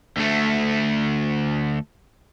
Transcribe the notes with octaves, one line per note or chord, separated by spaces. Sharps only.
D2 A3